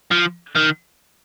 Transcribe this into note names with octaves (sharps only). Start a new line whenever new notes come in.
F3
D#3